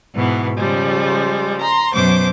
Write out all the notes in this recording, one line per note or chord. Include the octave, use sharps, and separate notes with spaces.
G#2 B2 E3 B3
C#3 F3 G3 G#3
A#5 C6
F#2 B2 C5 D6